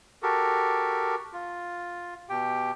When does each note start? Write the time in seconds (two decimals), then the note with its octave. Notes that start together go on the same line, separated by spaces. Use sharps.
0.23 F#4 G4 A4 A#4
1.33 F4
2.29 B2 G4 G5